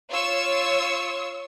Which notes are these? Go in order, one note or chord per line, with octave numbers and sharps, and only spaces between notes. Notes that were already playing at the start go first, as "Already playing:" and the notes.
F4 C#5 C#6 E6